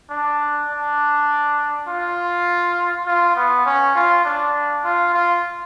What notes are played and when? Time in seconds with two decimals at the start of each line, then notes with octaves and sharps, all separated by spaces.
0.10 D4
0.70 D4
1.88 F4
3.06 F4
3.36 B3
3.66 C#4
3.95 F4
4.25 D4
4.84 F4
5.14 F4